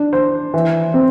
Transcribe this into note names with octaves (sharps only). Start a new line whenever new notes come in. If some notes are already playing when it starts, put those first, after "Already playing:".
Already playing: D4
C5
E3
C4